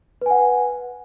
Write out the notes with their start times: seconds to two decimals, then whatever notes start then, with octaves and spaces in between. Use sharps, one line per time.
0.21 B4
0.26 G#5
0.30 F#5